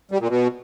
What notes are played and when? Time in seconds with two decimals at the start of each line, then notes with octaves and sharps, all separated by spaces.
0.11 G3
0.20 A#2
0.29 B2